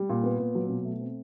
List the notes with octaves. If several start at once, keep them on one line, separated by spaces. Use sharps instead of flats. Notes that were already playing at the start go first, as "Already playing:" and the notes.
Already playing: G3
A#2
B3
A#2
F#3
B2
A3
C4